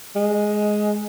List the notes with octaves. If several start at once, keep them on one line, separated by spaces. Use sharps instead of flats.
G#3